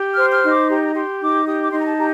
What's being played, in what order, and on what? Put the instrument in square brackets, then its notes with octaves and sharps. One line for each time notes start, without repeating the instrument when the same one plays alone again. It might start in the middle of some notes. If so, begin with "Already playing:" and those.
Already playing: [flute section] G4
F6
C5
F6
D#4 C6
D6
G4 A#5
A#5
G4 C6
D#4 D6
G4 D#6
D6
C6
D#4
A#5
A5
G4 A#5